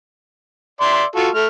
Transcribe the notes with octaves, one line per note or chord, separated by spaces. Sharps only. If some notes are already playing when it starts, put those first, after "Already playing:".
D5 E5 C6
F4 F#4 A4
A3 F6